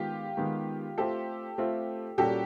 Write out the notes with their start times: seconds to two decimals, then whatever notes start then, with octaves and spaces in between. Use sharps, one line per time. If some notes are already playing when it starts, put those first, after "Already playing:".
Already playing: D#3 G#3 B3 F4 G4
0.37 D#3 G#3 B3
0.98 A3 C4 F4 G4 A4
1.58 A3 C4 F4
2.17 A#2 G3 A#3 C#4 F#4 G4 A4